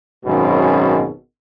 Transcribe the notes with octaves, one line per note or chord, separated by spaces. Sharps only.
G#1 F#2 B2 G#3 C#4